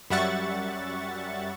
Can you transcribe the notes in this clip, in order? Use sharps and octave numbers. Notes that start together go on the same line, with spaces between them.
F#2 G3 E5 F#5 C#6 A6